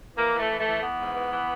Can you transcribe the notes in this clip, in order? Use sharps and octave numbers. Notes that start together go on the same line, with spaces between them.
E3 A#3
E3
A3
E3
A3
E3
E3 B3
G#2
E3
E3